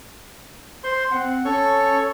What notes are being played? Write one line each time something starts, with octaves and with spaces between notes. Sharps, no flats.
C5 C6
C4 F#5
C#4 A4 C#5 C#6